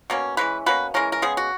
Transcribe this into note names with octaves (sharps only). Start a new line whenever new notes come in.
B2 A#3 C#4
E3 G#3 C#4 B4
B2 A#3 C#4 B4
E3 G#3 C#4 A#4
A#4
C#3 G#3 B3 G#4
F#4